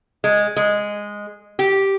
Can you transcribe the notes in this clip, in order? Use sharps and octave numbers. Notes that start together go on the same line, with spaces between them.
G#3
G#3
G4